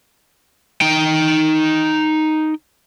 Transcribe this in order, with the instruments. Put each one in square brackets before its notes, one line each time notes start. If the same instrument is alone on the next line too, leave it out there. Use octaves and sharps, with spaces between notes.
[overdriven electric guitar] D#4 G5